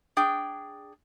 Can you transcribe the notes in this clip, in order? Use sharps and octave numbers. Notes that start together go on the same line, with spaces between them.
D4 G#4 G5